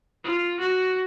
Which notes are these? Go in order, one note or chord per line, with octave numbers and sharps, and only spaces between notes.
F4
F#4